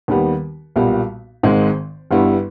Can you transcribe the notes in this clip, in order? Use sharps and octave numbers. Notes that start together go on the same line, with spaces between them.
D#2 D#3 G3 B3
B1 A#2 G3 B3
G#1 G#2 D#3 G#3
G1 G2 G3 B3 E4